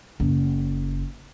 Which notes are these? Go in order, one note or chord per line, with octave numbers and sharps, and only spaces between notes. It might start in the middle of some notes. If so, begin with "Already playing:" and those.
F#1